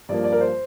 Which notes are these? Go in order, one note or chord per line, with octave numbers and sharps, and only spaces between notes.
G2 F3 A#3 D5
D5
A#4
C5